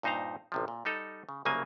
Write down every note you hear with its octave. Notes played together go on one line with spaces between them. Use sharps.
G2 A#2 D#4 C5 F5 A#5
A1 C3 F3
A#2
G3 D#4 A4 D#5 A#5
C#3
C2 C#3 F#3 A#3 G#5